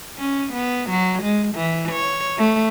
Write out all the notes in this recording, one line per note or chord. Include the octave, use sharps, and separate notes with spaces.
C#4
B3
F#3
G#3
E3
C#5
A3